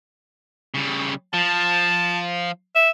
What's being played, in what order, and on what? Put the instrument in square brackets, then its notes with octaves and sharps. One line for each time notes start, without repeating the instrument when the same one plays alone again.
[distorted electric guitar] C#3 G3
[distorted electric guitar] F3 [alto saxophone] A5
[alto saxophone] E5